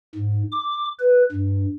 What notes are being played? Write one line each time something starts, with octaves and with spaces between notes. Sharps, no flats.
G#2
D6
B4
G2